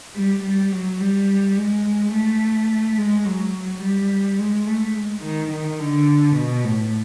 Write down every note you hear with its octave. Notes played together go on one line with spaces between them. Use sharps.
G3
G3
F#3
G3
G#3
A3
G#3
F#3
G3
G#3
A3
G#3
D#3
D#3
D3
B2
A2